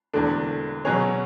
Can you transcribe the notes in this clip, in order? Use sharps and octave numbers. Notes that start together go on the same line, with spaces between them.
E1 E2 D3 A3 D4
B2 F#3 C#4 G#4 C#5